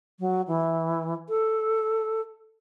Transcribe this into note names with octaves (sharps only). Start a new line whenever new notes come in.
F#3
E3
A4